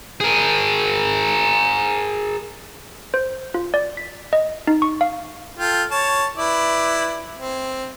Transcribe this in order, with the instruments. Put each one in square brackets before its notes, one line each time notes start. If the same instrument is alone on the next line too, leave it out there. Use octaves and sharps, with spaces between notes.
[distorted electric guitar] G#4 A#4
[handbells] C5
F4
D5
B6
D#5
D#4
C#6
F5
[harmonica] F4 A4 G5
C#5 A5
E4 B4 D5
C4